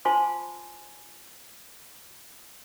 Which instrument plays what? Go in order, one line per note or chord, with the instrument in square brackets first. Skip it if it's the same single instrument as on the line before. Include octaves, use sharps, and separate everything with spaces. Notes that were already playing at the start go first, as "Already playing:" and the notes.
[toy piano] F4 C5 G#5 A5 C6 D6